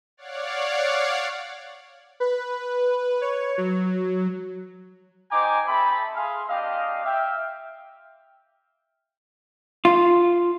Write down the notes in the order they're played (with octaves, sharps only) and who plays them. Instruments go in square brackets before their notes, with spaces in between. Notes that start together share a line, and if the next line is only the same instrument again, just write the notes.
[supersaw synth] C#5 D5 F5 F#5
B4
C#5
F#3
[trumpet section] D#4 G4 C5 G#5 A#5 D6
C4 A4 E5 B5
G#4 F5 C6
C4 D4 G4 D#5 F5
E5 F5 G5
[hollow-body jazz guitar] F4